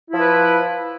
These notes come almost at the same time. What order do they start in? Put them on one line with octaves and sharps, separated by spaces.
E4 F3 B4